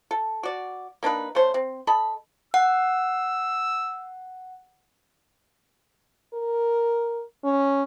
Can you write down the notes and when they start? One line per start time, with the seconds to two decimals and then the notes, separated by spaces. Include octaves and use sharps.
0.11 A4
0.43 F#4 D5
1.03 A#3 D4 D#4 B4
1.35 A3 C#4 C5
1.54 C4
1.87 A4 D#5 A5 B5
2.54 F#5 E6
6.34 A#4
7.44 C#4